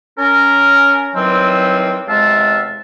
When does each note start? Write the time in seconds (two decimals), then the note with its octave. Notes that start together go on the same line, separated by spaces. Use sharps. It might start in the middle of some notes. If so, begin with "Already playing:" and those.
0.18 C#4 A#4
1.15 D#3 E3 F#3 G3 C4
2.07 E2 C3 G#3 E5 F5 A5